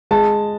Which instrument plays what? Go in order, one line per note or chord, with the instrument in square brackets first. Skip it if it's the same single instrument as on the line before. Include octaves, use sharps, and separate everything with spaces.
[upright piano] G#3 A5